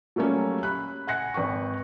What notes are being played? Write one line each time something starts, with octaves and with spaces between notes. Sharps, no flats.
F#3 G3 A3 A#3 C#4
B5 F#6
F#5 G#5 F#6 A#6 C#7
G#1 B4 G5 C#6